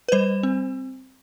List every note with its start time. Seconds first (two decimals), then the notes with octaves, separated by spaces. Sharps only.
0.09 B4
0.12 G3 C5
0.43 C4